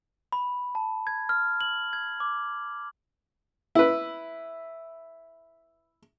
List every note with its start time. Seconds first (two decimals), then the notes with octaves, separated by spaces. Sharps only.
0.32 B5
0.75 A5
1.07 G#6
1.29 F6
1.61 F#7
1.93 G#6
2.20 D6
3.75 E4 B4